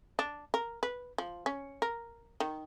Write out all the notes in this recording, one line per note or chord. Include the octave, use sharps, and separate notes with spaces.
D4
A#4
B4
F3
C#4
A#4
D#3